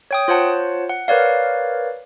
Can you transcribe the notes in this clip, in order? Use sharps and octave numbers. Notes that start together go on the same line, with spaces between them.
C#5 G5 D#6
F4 C5 C#5 F#5 A5
F#5
A#4 B4 C#5 D5 F5